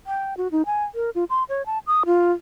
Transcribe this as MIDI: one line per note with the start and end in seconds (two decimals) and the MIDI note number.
0.07 0.34 79
0.37 0.48 66
0.52 0.62 63
0.66 0.84 80
0.95 1.10 70
1.15 1.24 65
1.30 1.44 84
1.49 1.65 73
1.66 1.79 81
1.87 2.04 87
2.06 2.32 65